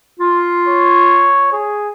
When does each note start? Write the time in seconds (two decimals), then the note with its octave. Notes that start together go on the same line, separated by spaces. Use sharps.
0.19 F4
0.68 C#5
1.53 G#4